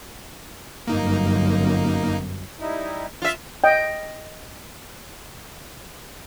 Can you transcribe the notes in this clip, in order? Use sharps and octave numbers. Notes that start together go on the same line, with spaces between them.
G1 F#2 A#3 D#4
G3 D#4 E4
F4 E5
D#5 G5